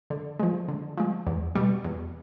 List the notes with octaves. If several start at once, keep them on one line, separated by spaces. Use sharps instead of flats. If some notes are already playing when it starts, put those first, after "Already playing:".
D3
F3 G#3
D3
F3 G#3
E2
B2 G3
E2